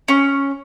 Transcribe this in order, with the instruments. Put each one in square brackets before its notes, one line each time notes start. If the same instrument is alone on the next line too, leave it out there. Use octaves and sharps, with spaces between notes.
[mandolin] C#4